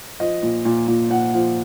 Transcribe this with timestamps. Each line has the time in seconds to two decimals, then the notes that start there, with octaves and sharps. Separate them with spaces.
0.20 F3 D#5
0.43 A#2
0.65 A#2
0.88 A#2
1.10 A#2 F#5
1.34 F3